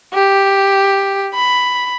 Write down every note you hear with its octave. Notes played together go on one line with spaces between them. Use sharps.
G4
B5